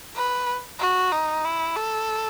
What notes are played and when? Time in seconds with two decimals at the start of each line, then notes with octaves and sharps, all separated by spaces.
0.16 B4
0.80 F#4
1.12 D#4
1.45 E4
1.76 A4